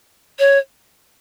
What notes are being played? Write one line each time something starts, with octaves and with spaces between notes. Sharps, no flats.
C#5